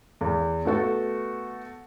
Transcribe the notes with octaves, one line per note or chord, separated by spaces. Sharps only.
E2
A3 B3 F#4 A4